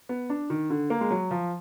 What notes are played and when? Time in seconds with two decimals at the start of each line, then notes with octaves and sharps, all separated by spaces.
0.09 B3
0.30 D4
0.50 D#3
0.70 D3
0.90 A#3
1.01 G#3
1.11 F#3
1.31 F3